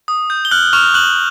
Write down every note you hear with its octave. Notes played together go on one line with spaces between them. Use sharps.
D#6
G6
G7
F6 F#6 F#7
C#6 F6 F7
C#6 F#6 F#7